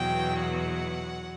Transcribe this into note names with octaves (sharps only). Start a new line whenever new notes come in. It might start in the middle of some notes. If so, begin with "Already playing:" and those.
Already playing: E2 B2 F#3 G5
F#5